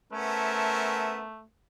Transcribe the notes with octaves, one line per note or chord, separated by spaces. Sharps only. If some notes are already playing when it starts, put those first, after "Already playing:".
A3 B3 C#4 A#4 C5 E5 A5